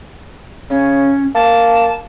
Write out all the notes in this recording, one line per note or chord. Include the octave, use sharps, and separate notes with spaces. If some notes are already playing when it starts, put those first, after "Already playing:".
C#3 C#4
A#3 A5